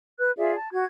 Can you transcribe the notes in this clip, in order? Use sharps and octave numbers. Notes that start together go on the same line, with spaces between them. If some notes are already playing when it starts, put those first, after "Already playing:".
B4 F#6
F4 G#4 D5 E5
A5
F#4 G#6